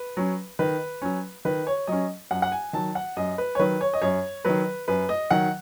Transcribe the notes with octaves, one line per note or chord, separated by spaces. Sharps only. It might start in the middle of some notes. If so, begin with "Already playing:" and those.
Already playing: B4
F#3 C#4
D#3 B4
F#3 C#4
D#3 B4
C#5
F#3 C#4 D#5
F#2 F#5
F#5
G#5
D#3 F#3 A5
F#5
F#2 D#5
B4
C#5
D#3 F#3 B4
C#5
D#5
F#2 C#5
D#3 F#3 B4
F#2 B4
D#5
D#3 F#3 F#5